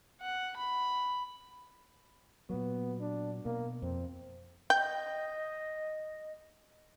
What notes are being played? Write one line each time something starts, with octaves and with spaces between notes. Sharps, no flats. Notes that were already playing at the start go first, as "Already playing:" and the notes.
F#5
B5
A#2 F#3 B3
D4
B2 A#3
F2 C4
D#5 G5 G6